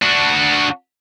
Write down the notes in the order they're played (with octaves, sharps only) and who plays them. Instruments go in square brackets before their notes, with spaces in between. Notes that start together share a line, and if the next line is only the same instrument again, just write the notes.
[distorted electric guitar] D4 F#4